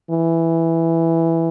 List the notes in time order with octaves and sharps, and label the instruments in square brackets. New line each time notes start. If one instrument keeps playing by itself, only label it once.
[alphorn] E3